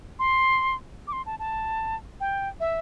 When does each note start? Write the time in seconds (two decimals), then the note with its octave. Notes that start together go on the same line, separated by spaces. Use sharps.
0.19 C6
1.08 D6
1.13 C6
1.26 A5
1.39 A5
2.20 G5
2.60 E5